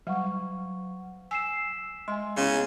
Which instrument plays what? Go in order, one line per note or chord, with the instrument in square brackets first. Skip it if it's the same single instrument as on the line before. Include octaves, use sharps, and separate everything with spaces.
[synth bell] F#3 [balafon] G3 [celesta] F5 F#5 C#6
[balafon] G#5 [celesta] E6 C7 E7 [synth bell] B6
[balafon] G#3 [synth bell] D#5 [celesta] G#5 C6
[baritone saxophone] C#3 [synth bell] B3 [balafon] E4 D#5